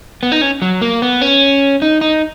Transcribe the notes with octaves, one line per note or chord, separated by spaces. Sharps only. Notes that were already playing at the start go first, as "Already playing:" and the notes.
B3
D#4
C#4
F#3
A#3
B3
C#4
D#4
D#4